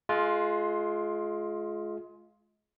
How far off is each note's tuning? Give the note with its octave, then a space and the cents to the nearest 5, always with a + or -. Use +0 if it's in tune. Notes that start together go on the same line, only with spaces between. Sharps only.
G#3 +30 F4 +0